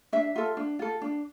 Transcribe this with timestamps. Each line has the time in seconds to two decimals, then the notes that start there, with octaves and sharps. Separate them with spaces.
0.13 D4 E5
0.36 F4 A4
0.57 D4
0.79 F4 A4
1.02 D4